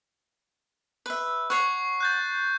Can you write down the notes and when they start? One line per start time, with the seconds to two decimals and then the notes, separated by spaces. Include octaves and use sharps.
1.06 B4 E5
1.50 C#5 F#5 C#6 C7
2.00 F#6 G6 A6